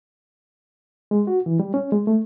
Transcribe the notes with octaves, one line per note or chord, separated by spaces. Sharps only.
G#3
F#4
E3
G3
C#4
G#3
A3